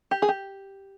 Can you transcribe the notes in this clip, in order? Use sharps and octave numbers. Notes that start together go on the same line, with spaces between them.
G4
G#4
G4